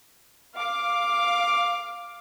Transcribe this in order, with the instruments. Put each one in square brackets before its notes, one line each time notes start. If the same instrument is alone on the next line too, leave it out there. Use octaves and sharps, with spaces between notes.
[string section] F5 D6